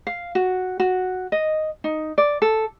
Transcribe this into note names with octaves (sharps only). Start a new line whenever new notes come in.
F5
F#4
F#4
D#5
D#4
D5
A4